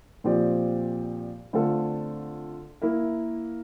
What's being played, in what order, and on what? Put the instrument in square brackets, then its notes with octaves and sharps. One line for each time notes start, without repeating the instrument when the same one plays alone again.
[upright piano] A#2 F3 C4 G4 D5
D3 A3 C4 F4 A4
A#3 E4 A#4 E5